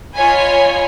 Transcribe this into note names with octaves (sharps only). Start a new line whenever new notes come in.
F4 C#5 D#5 G#5 B5